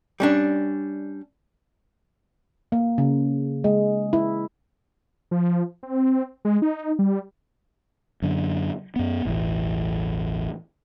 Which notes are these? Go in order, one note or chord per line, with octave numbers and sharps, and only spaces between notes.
G3 C#4 D4
A#3
C#3
G#3
E4
F3
C4
G#3
D#4
G3
F#2 D3
F#2 B3
E1 A1 E3